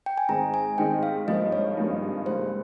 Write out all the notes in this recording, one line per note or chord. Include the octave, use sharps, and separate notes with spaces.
G5
G#5
G#2 D#3 G#3 C4 D#4 A#5
G#5
G#2 D#3 G#3 C4 D#4 G5
F5
G#1 G2 F3 A#3 D#4 D#5
C#5
G#1 G2 F3 A#3 D#4
C#2 C3 G3 A#3 C5